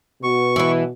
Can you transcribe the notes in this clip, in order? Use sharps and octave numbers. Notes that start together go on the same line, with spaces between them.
B2 C#6
E3 E4